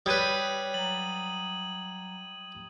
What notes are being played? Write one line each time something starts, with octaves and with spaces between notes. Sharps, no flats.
G3 B4 C#5 D#6 G#6 D#7
F#3 A#5 F#7